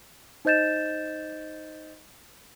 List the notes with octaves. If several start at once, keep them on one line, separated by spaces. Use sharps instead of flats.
D#4 C5 D#5 G6 A6 E7